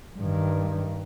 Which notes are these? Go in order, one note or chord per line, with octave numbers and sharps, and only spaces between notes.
G2 D#3